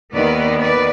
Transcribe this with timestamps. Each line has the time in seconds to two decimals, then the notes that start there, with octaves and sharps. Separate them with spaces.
0.13 D#2 D#3 B3 B4 D5
0.62 B4 D5